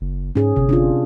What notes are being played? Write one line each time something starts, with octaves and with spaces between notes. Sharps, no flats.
F#1
G#2 C#4 G#4
G1 C3
D4 F4